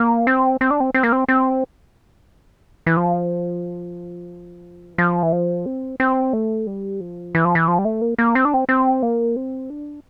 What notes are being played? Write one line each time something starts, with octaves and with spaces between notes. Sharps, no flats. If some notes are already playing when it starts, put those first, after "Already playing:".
Already playing: A#3
C4
C4
D4
C4
C4
A#3
C4
C4
E3
F3
E3
F3
E3
F3
C4
C4
A3
G3
F3
E3
F3
E3
F3
G3
A3
A#3
A#3
C4
D4
C4
C4
A#3
C4
D4